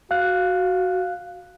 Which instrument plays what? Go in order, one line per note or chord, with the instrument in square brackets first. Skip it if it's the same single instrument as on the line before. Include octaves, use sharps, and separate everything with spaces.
[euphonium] F#4 [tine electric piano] F5 F#6